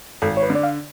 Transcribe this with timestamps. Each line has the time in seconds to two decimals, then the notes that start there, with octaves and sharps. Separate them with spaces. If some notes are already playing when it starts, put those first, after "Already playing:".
0.22 G#1 A4
0.37 C#5
0.43 B4
0.50 D3
0.55 D5
0.63 F5